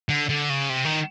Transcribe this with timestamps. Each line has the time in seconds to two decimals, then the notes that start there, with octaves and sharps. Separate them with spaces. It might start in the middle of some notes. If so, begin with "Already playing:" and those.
0.09 D3
0.29 D3
0.50 C#3
0.70 C3
0.85 D#3